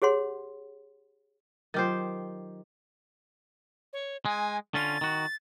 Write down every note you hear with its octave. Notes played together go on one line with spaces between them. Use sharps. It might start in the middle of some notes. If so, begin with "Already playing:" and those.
G4 G#4 C#5 F#5 C6
D#3 F#3 F4 G4 C5
C#5
G#3 G#5
D3 C#4 F4 A6
D#3 F#4